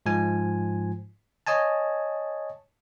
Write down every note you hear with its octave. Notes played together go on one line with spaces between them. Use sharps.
G#2 F3 G#5
C#5 D#5 G#5 A5